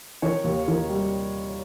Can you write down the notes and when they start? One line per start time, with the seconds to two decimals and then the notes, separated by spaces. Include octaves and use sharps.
0.22 D#3 C#5
0.44 D#2
0.68 D#3
0.90 G3